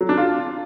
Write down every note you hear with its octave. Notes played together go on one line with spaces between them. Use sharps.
F#3
D4
F4